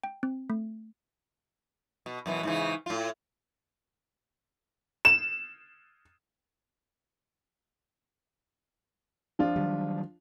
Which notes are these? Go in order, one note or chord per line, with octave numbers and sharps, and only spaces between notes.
G5
C4
A3
B2
F#2 B2 E3
G#2 C#3 E3
A2 F4
E7
F3 D4 F4
D#3 F#3 G3